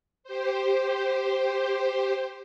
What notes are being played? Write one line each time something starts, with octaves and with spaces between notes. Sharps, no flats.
G4 C5